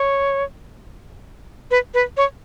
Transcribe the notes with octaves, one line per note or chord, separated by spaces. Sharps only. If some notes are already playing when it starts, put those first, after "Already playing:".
Already playing: C#5
B4
B4
C#5